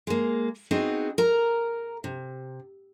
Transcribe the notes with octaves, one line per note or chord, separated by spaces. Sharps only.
G#3 A#3
B3 C4 D#4 F#4 G#4
A#4 A#5
C3